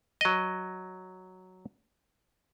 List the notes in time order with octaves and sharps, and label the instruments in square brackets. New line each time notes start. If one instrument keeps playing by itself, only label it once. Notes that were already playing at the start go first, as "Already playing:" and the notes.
[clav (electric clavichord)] F#3 D#5